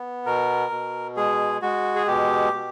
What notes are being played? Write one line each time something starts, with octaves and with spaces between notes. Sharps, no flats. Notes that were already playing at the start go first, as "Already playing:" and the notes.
Already playing: B3
B2 A#4
B2
G#3 G#4
G#3 F#4
G#4
B2 G4
B2